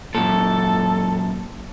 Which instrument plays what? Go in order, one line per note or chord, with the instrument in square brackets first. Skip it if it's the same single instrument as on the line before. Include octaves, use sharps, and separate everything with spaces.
[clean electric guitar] F#2 A#2 [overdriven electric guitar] A4